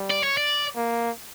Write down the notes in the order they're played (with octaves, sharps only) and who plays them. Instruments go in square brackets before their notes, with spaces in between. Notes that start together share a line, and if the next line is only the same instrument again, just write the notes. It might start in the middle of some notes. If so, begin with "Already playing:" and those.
Already playing: [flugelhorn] G3
[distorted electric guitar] D5
C#5
D5
[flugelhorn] A#3